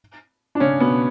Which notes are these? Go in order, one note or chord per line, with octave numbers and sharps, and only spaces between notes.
D4
C#3 C#4
B2 B3